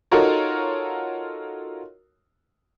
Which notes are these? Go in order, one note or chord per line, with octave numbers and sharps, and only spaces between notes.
D#4 F4 F#4 A4 A#4 C#5